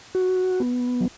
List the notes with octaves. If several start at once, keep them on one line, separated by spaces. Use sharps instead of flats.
F#4
B3
F#3